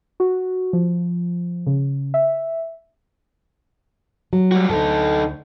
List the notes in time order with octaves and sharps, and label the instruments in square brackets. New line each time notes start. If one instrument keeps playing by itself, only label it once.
[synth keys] F#4
F3
C#3
E5
[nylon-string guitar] F#3
[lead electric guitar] G3 F#4
[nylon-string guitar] D2 G#2 [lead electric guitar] D#4 A4